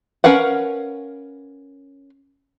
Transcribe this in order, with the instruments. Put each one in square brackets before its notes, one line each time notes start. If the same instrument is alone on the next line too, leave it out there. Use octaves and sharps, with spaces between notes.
[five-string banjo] C#4 A#4 B4 F5 F#5